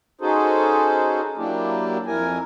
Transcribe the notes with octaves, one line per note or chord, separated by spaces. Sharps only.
C#4 D#4 F#4 G#4 A4 C5
F#3 A#3 D4 E4 G4
F2 E4 A#4 G#5